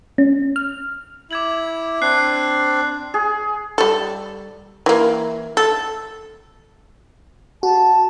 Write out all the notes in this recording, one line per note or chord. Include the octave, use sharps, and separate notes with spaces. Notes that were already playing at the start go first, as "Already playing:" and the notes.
C#4
F6
E4 D6 G#6 F#7
C4 D4 F#6 C7
G#4
G3 A4
E3 A#3
A4
F#4 A5